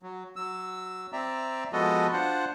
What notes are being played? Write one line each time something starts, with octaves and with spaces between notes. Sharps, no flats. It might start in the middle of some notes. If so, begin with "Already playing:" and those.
F#3
F#3 E6
C4 D5 E5 A#5
F3 G#3 B3 F#4 A4 D#5
D4 F4 C5 F#5